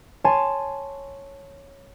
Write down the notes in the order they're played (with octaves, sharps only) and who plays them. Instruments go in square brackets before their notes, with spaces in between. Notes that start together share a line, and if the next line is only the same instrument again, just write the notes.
[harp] C#5 G#5 A5 C6